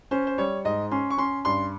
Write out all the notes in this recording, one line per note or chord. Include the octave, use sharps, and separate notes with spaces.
C#4 C5
C5
G3 C#5
G#2 D#5
C#4 C6
C#6
C#4 C6
G2 C6